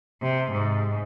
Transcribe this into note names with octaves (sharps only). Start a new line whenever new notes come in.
C3
G#2